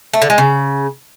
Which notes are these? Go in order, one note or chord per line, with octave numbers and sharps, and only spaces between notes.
A3
D3
G#3
C#3